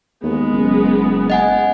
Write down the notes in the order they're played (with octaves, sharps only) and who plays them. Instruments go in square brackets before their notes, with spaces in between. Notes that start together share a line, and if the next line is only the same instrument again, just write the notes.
[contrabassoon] D#2 [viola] G#3 B3
[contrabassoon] F#1
[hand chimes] D#5 F#5 G#5